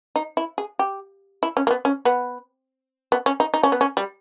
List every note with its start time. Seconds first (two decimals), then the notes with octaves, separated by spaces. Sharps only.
0.16 D#4
0.37 E4
0.58 G#4
0.79 G4
1.43 E4
1.57 C#4
1.67 A#3
1.71 B3
1.85 C#4
2.05 B3
3.12 B3
3.26 C#4
3.40 D#4
3.54 D#4
3.63 C#4
3.72 B3
3.81 C#4
3.97 G3